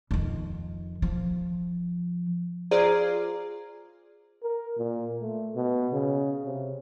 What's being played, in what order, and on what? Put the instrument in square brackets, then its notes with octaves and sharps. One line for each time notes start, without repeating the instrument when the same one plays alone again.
[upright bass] F2 D#3
F3
[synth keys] F4 G#4 C5 D5 A#5
[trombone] A#4
A#2
A3
B2
C#3
C3